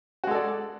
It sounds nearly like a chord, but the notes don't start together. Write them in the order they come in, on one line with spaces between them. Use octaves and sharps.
F#4 G#3 A4 D5